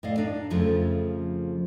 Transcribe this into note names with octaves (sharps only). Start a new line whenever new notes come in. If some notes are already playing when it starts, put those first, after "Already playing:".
A2 D5 D#5 F5
D4 D#4
F2 C#3 F3 A3